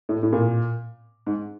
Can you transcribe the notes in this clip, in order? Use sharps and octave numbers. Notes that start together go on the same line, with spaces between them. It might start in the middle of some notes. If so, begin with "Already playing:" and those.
A2
A2
A#2
G#2